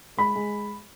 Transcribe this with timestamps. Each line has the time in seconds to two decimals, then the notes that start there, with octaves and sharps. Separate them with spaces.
0.17 G#3 B5
0.35 G#3